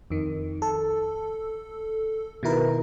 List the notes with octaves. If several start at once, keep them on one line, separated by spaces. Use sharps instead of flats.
F2 D#3
A4
B2 D#3 E4 A#4 B4